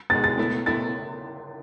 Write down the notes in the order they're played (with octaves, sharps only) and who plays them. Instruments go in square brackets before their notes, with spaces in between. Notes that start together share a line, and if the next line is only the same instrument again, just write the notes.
[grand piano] B2 G#3 D#4 F#4 [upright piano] A6
[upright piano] A6
[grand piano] B2 A3 E4
[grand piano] B2 A3 E4 [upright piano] A6